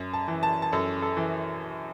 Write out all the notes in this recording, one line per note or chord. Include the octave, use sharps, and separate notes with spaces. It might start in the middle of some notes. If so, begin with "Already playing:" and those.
Already playing: F#2
A5
E3
A5
A5
F#2 A4
A4
E3